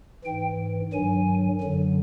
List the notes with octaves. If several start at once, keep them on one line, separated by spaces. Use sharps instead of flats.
G#2 E3 G5
G2 D#3 F#3 G#5
F#2 D3 F#3